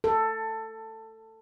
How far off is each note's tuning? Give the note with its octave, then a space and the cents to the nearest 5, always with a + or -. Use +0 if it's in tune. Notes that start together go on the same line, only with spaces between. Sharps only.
A4 +15